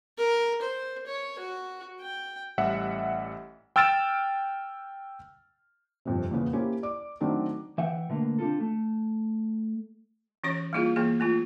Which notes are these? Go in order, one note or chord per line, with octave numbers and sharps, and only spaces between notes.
A#4
C5
C#5
F#4
G5
A1 G3 E5 F#5
G5 E6 F6 A6 D7 E7
G1 F2 C3
E2 A#2 C#3 B3
A#3 C#4 E4 G4 C5
D5 D6
D#3 F#3 A3 C4 D4 D#4
E3 E5 F#5 G5
B2 D3 A3 A#3
C4 D4 D#4 F4 A4
A3
E3 C#4 F#4 C#5 C#6
G3 A#3 E4 F4 G#4
E3 A#3 B3 G#4
A3 B3 F4